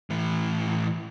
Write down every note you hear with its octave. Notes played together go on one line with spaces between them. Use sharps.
A2 E3